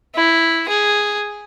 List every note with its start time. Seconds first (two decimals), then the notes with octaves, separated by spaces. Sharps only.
0.15 E4
0.69 G#4